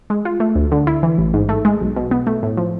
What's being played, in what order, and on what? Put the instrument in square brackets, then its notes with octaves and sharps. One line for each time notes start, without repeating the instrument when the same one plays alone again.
[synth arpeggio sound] G#3
F4
A3
D2
D3
E4
E3
A1
G#2
A3
G#3
B1
B2
B3
A3
A2
F3